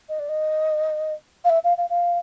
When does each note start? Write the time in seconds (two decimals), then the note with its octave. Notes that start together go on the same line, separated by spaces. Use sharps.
0.09 D#5
0.19 D5
0.29 D#5
1.45 F5
1.50 E5
1.64 F5
1.78 F5
1.90 F5